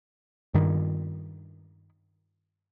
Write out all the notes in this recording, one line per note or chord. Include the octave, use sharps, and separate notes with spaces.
G2 D#3